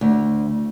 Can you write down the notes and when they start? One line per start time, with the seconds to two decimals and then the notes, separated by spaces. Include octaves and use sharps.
0.01 D2